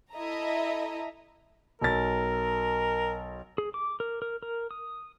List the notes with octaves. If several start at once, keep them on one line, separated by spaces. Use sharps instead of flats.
E4 A4 D#5 E5 A#5
B1 A#4 A6
G#4
D6
A#4
A#4
A#4
D#6